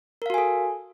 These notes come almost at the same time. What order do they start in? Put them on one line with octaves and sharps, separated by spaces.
A#4 F5 F#4 G#5 A4